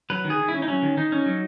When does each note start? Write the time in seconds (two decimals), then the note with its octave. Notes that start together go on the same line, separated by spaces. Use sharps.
0.10 F#3 B4
0.25 D#3
0.30 G#4
0.39 D#3
0.48 E4
0.54 C#4
0.62 D#4
0.68 F#3 C#4
0.82 D#3
0.97 D#3 D#4
1.12 C#4
1.26 F#3